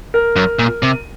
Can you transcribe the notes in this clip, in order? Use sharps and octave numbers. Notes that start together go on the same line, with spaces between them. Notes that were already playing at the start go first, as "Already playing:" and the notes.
A#4
F#2
A#2
C3